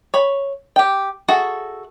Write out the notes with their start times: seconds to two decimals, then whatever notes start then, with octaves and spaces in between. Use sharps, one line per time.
0.14 C#5 B5
0.76 G4 G5
1.28 F#4 G#4 A4 E5